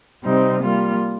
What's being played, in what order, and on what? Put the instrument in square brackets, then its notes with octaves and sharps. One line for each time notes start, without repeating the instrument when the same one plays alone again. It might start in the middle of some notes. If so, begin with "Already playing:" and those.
[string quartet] C3 G3 C4 D#4
G3 A#3 F4